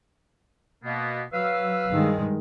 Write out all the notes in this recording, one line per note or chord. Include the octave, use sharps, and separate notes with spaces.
B2 A#3 B3
F#3 B4 F5 E6
G2 D#3 G#3